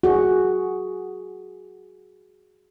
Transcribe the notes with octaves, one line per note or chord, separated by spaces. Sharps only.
F#4 G#4